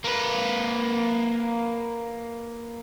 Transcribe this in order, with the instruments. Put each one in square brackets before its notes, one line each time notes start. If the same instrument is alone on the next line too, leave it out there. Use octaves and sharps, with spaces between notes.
[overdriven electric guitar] A#3 B4